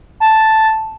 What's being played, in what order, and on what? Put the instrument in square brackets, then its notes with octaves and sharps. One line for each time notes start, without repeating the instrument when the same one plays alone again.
[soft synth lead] A5